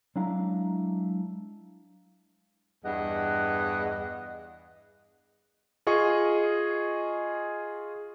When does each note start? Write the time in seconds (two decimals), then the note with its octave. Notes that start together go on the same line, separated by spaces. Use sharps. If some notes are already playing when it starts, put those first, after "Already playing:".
0.16 F#3 G#3 D4 E4 F5 A#5
2.85 E2 G2 D#5 F#5
5.87 F4 G#4 D#5 C#6